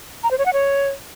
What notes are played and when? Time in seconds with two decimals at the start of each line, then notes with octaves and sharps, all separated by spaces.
0.23 A#5
0.31 C5
0.38 C#5
0.46 F#5
0.53 C#5